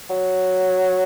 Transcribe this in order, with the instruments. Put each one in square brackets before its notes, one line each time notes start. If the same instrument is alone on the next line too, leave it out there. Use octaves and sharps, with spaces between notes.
[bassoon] F#3